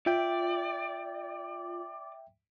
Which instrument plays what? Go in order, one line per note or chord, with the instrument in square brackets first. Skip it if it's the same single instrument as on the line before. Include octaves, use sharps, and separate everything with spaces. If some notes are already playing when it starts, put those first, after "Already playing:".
[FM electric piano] F4 [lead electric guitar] D5 [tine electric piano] E5 G5